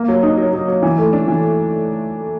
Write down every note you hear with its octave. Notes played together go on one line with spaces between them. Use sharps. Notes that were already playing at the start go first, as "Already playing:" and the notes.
Already playing: A#3
F#3
D#4
F#3
F#3
F#3
E3
A3
D4
E3